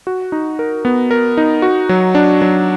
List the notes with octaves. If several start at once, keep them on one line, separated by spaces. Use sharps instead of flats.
F#4
D#4
A#4
B3
A#4
D#4
F#4
F#3
D4
F#3